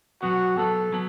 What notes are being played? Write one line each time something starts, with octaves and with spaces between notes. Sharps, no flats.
B2 F#3 B3 F#4
B2 F#3 B3 A4
B2 F#3 B3